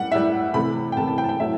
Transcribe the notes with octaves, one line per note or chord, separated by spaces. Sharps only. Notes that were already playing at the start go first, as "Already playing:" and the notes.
Already playing: G3 F#5
A2 G3 E5
C3 E3 A3 B5
G5
C3 E3 A3 A5
A5
G5
A5
G5
A2 F#3 A3 E5